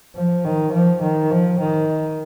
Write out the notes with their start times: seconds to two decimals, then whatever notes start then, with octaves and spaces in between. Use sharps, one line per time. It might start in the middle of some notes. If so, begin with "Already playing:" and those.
0.15 F3
0.45 D#3
0.73 F3
1.03 D#3
1.31 F3
1.60 D#3